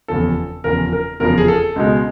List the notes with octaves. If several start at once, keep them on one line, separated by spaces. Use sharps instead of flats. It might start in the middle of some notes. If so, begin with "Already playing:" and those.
F1 E2 C#3 F3 A4
F1 E2 C#3 F3 A#4
A#4
F1 E2 C#3 F3 A#4
G#4
A4
C#2 B2 G#3